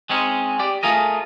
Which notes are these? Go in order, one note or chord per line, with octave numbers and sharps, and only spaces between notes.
G#3 C4 C#4 D#4
G4 D5
A3 F4 G#4 A#4 D#5